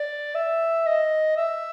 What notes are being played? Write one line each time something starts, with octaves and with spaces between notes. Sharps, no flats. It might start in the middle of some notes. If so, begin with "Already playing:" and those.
Already playing: D5
E5
D#5
E5